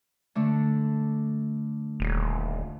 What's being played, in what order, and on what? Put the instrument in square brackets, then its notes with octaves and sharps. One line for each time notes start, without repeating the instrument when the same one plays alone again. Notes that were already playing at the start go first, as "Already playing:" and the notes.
[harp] D3 A3 D4
[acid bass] D#1